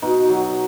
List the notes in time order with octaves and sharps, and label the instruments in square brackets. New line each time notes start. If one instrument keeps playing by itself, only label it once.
[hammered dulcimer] B2 D#4
F#3